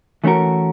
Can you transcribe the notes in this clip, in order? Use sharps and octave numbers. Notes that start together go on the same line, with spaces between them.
E3 A3 C#4 F#4 A#4